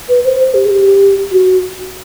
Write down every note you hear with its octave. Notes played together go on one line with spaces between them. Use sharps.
B4
C5
C5
G4
G#4
G4
F#4